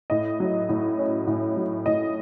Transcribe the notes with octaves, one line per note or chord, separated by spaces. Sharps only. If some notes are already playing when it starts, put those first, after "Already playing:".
A2 D#5
F#3
A2
C#4
A2
F#3
A2 D#5